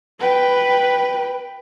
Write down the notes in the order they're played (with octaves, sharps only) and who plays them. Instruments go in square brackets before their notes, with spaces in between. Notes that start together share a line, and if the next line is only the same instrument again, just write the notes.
[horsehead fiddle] B4 G5